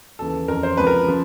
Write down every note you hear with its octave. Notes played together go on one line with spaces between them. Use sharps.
D#2 C#3 E3 A4
F2 C#3 E3 A#4
C5
C#2 C3 F3 B4
A#4
C#3 F3